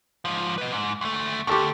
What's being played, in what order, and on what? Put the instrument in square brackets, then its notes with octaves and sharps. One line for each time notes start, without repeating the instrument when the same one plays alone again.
[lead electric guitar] G#2 F3
B4 D#5
G#2
D2 A3
[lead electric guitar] D2 G#2 [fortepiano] G4 A4 C#6